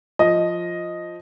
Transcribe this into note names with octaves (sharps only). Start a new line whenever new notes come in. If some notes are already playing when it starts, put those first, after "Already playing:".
F3 D#5